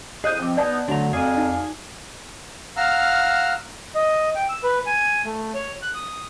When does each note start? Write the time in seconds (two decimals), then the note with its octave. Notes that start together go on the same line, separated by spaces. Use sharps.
0.24 F2 E4 G#4 C5 D#5 D#6 F#6 G6
0.39 F3 C4 G5 D6
0.57 B3 D#4 D5 A5
0.88 D3 F#3 A3 D4 F#4 A#5
1.13 F2 G#4 D5 E5 F5 G#5
1.37 D#4
2.77 F5 F#5 A#5 E6 F6
3.95 D#5
4.35 G5
4.49 E6
4.63 B4
4.86 G#5
5.25 A3
5.54 C#5
5.82 F#6
5.95 D#6